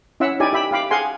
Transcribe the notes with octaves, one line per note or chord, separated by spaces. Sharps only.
C#4 E4 E5 F#5 E6
D#4 E4 G4 D5 G#5
G4 E5 B5
G4 F5 B5 D6
G#4 F5 F#5 G#5 C6